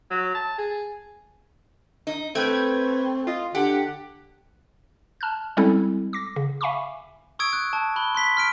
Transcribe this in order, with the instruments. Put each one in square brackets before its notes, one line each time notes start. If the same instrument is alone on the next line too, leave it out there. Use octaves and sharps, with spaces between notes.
[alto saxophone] F#3
A5
G#4
[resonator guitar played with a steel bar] D#4
[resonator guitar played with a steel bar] A3 [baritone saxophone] C4 [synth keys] B4 G5 G#6
[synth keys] F4 D#5
[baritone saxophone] D3 [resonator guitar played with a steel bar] G4 [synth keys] F#5
[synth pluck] A5 F6 F#6
G3 G#3 C4 C#4 E4 A4
D6 A#6
C#3
E5 F5 G#5 B5 C#6 D6
[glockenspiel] C#6 D#6 E6 G#6 D7
F#6
A5
B5 F#6 G7
C6 F#6 B6
F6 B6 D7